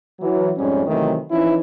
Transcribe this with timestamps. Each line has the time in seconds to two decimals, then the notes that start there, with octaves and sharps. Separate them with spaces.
0.20 E3 F#3
0.57 F2 G#2 G3 C#4
0.86 C3 D#3 E3 F#3 A3
1.30 E3 F3 C#4 D#4 E4